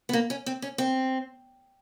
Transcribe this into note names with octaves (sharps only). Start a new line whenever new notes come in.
B3
A#3
C#4
C4
C#4
C4